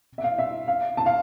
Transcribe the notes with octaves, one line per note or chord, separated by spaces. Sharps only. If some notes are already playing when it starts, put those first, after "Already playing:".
E5
F5
E5
F5
A5
F5